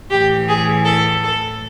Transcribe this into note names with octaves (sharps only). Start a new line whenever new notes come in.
A2 E3 G4
G#4
A4
A4